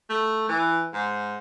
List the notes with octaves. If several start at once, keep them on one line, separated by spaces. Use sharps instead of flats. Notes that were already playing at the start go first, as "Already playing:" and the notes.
A3
E3
G#2